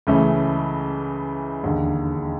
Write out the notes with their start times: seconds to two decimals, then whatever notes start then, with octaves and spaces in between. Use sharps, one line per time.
0.07 C#2 C#3 E3 A3 C#4
1.63 E1 D#2 D3